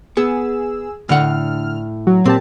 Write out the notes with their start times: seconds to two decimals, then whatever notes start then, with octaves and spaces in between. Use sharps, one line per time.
0.17 B3 G#4 E6
1.09 A2 D3 F#5 F6
2.07 F#3
2.26 A#2 C4 G4 A5